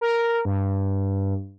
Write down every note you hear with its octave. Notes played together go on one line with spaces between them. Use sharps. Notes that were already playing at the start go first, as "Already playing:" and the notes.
A#4
G2